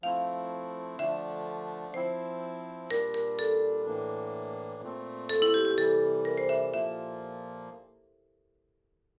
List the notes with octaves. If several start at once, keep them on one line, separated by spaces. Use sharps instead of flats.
F3 A3 C4 E4 F5
D3 F3 A3 D4 E5
F3 C4 E4 C5
A#2 G3 D4 A#4
A#4
A4
A2 E3 A#3 D4
A#2 A3 C4
A4
E4
G4
G4
C3 E3 G3 A4
A#4
C5
E5
A#2 F3 A#3 E5